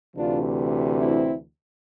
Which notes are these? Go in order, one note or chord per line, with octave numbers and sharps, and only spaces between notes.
D2 C3 E3 D4 F4
C4 E4